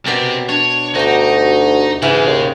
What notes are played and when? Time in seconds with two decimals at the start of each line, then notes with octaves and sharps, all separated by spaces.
0.06 B2 C4 G4 D5 A#5
0.49 D4 C#5
0.95 D2 D#4 F#4 G4
2.02 G#2 C#3 E3
2.27 D#2